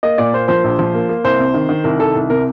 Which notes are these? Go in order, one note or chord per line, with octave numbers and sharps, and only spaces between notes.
A#3 D#5
A#2 D5
A#3 C5
F3 C5
A#1
F3
A#3
A#3
C2 C5
C3
D#3
D#3
C2 A#4
D#3 A4
C2
C3 A#4